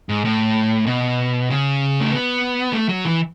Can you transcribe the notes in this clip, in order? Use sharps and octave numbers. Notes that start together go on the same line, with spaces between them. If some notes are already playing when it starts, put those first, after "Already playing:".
G#2
A2
B2
C#3
A3
B3
A3
F#3
E3